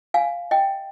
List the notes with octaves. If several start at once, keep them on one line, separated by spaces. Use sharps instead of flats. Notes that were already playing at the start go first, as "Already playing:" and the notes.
F5 G#5
D#5 G5